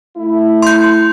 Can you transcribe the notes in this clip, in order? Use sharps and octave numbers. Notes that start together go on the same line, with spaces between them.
A3 E4
C6 G6